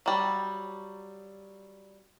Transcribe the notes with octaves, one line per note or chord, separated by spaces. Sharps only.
F#3 G3